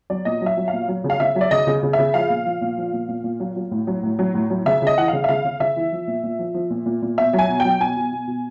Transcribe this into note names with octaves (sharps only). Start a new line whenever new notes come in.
F#3 D5
A#2 D#5
F#3
E5
F#3
F5
A#2
F#3
C#3
F5
C#3 E5
F#3
D5
C#3 D#5
C#3
C#3
E5
C#3
F3 F5
A#2
F3
A#2
F3
A#2
A#2
A#2
F#3
F#3
A2
F#3
A2
F#3
A2
F#3
C#3 E5
C#3 D#5
E3 F#5
C#3 F5
E5
C#3 F5
C#3
C#3 E5
E3
F3
A#2
A#2
F3
F3
A#2
A#2
A#2
B2 E5
F#3
G#5
B2
G5
F#3
B2 G#5
B2
B2
B2